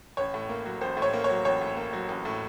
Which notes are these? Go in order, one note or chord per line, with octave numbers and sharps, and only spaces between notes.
A1 C#5
A2
A#3
F#3
A1 C5
A2
C#5
A#3
C#5
F#3
A1 C#5
A2
A#3
F#3
A1
A2